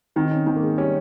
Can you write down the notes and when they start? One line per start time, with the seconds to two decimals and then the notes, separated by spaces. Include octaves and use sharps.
0.16 D#3 C4
0.25 D#4
0.31 C#4
0.47 D#3 C4
0.56 A#3
0.62 G#3
0.78 G3 C#4